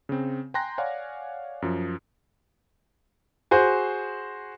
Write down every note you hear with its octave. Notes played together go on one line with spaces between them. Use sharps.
C#3 C4
G5 G#5 A#5 C6 F#6 A#6
C#5 D5 F5 F#5 G#5
F#2 F3
F#4 G#4 C5